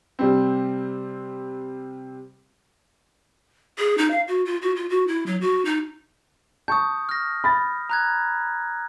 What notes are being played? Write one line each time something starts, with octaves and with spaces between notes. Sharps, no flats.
C3 G3 C4
G#4
D#4
F5
F#4
F4
F#4
F4
F#4
E4
F#3
F#4
D#4
A5 C#6 D#6 G6
F6 A#6
B5 A6
A#5 F#6 G#6